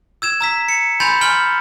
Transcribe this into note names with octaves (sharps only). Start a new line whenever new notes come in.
E6 G#6 E7
A#5 E6 B6
C#7
G#5 B5 C6 G6 A6 F7
G#5 C6 F6 F#7 G7